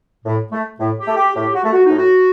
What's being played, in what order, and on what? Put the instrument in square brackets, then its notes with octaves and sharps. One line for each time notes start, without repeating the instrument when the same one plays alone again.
[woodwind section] A2
A3
A2
G4
A3
G4
A2 G4
F#4
A3
F#4
A2 D#4
F#4